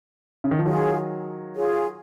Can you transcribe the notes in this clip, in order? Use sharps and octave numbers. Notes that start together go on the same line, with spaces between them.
C#3
D#3
F3
D#3 F#3 F4 G#4 C#5
F4 G#4 C#5